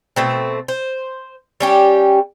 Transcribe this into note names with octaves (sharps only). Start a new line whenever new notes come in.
B2 A3 C4
C5
G3 C#4 G4